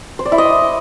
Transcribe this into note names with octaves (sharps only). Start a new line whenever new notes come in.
C5
D5
E4
D#5